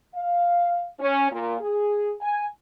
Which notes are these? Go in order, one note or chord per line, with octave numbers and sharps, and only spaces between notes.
F5
C#4
A#2
G#4
G#5